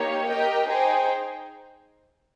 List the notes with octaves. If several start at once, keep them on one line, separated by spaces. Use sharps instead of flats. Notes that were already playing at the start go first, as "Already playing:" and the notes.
Already playing: A#3 D#4 G4 C#5
G4 A#4 D#5 G5
D#4 G#4 C5 G5